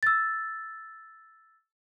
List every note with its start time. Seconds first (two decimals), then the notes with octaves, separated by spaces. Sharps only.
0.03 E6 A6